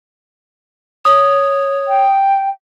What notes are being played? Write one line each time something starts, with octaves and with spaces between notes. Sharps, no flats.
C#5 D#6
G5